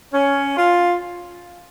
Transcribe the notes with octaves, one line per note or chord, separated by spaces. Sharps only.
C#4
F4